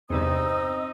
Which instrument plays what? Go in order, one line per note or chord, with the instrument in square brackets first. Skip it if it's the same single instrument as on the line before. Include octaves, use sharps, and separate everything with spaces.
[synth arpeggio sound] E2 G2 C3 [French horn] C4 [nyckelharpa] D#4 [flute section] D#5 D#6 E6